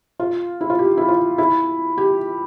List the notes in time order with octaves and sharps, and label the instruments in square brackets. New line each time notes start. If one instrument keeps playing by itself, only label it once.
[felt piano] F4
E4
F4
G4
E4
F4
E4
G4